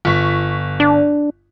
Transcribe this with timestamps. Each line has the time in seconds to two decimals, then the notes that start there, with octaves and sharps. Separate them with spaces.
0.05 G1 C#6 B6
0.80 D4